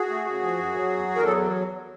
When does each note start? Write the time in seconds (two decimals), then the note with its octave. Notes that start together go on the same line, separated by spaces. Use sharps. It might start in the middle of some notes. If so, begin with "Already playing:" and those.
Already playing: F#4 G#4
0.09 A3
0.26 C#3
0.42 F3
0.59 F#2
0.75 F#3
0.92 E2
1.08 E2
1.15 A#4
1.24 F#3 A4